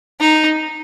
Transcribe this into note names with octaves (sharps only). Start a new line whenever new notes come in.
D#4